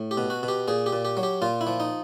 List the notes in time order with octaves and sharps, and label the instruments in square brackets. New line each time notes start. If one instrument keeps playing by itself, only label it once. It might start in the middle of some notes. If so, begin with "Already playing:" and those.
Already playing: [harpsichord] A2
G4
B2
F#4
B2
G4
A#2 G#4
G4
A#2
G4
F#3
G4
A#2 F4
E4
F3
D#4